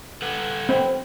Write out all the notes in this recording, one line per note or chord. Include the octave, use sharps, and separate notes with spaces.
A4 B4 F#5
C4